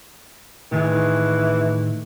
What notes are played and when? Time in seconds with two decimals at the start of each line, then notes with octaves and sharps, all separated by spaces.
0.72 A2 D#3 E3 G#4